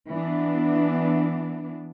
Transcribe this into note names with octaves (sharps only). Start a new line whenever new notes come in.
E3 B3 D4